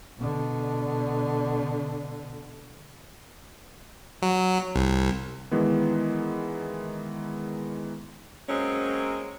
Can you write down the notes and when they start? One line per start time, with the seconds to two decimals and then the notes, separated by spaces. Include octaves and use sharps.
0.18 B2 D3
4.22 F#3
4.75 C2
5.51 D#3 E3 G#3 B3
8.47 F#3 G#3 A#3 C4 C#4